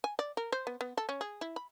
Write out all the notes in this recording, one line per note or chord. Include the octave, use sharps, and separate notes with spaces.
G#5
D5
A#4
C5
B3
B3
A4
C#4
G#4
E4
B5